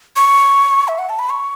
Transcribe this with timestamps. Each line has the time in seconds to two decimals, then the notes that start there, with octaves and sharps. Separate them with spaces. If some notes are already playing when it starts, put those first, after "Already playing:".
0.16 C#6
0.88 E5
0.98 F#5
1.09 A5
1.19 B5
1.30 C#6